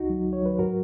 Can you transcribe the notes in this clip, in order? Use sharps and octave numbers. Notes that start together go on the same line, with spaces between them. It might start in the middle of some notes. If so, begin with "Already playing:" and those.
Already playing: C#2 D#4 F#4
F#3
C#2
C#5
F#3 B4
G#2 F#4 A#4